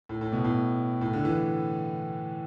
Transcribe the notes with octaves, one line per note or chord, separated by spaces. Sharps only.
A2
A2
B2
A2
A2
D3
E3